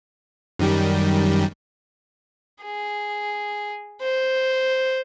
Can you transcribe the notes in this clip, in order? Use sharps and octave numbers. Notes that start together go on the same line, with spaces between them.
F#2 D#3 G3
G#4
C5